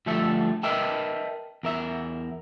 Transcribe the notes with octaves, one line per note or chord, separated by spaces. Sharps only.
D2 F3 G3 A3 A4 E5
A#4 B4 D#5 E5 G5 A5
E2 A#4 E5